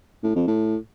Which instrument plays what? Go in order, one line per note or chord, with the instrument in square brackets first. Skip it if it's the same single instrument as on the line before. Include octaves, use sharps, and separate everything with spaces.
[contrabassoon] A2
F2
A2